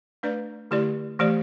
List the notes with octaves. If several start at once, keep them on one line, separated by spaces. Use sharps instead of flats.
A3 D4 B4 D5
D3 A3 E4 G4 D5
E3 A3 G4 D5